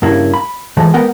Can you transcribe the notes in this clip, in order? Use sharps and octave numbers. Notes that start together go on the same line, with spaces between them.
G2 C#3 A#3 E4
B5
E3 F3 G#3 A3
G#3 B3 A#4 F#5 G5